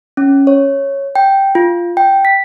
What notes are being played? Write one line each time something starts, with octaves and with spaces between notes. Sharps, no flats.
C#4
C#5
G5
F4
G5
B6